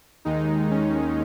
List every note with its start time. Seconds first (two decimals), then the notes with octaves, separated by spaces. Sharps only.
0.25 D#2 D#3 G#3 D#4
0.71 C#4